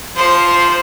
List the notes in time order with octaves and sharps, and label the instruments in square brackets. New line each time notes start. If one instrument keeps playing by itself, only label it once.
[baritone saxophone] F3 [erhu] C5